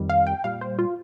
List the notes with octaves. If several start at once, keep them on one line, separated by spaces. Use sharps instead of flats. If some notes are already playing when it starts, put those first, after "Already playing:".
Already playing: F2 D#3 G3
F5
G5
A#2 G3 F5
C5
F4